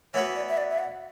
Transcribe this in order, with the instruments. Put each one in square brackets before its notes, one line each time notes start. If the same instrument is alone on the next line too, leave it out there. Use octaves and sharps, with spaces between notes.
[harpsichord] E3 B3 F#4 B4 [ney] C#5
[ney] D5
E5
D5
E5
F#5